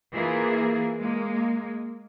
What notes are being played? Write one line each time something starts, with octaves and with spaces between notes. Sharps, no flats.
E3 A#3 F4 G#4
G#3 A#3